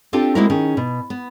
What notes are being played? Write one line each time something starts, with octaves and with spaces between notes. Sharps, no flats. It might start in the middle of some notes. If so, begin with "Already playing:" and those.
C4 D4 F4 G4 A4
G#3 A#3 C4 E4 F#4 A#4
D#3 C#4 G#4
B2
B3